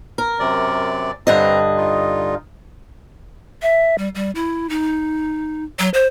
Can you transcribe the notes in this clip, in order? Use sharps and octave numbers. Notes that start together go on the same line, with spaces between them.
A#4
F#2 C3 D5
G2 D3 C4 D#5 A#5
D#4 F4
E5
G3
G3
E4
D#4
F#3
C5